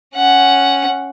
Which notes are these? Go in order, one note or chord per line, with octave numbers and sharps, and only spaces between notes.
C#4 F#5